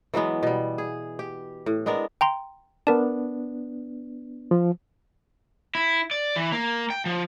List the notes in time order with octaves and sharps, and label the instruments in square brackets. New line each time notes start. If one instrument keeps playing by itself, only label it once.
[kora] E3 F#3 G#3 B3
B2 G3
G#4
G4
A2
G#3 B3 D4 A#4
[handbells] G5 A#5 C6
[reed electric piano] B3 D4 [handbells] A#4 A5
[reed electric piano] F3
[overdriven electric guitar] E4
D5
E3
A#3
G5
F3